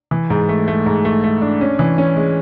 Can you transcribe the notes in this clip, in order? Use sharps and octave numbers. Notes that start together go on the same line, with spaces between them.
E3
G#2
A3
A3
G#2
A3
A3
D4
C#4
E3
C#4
G#3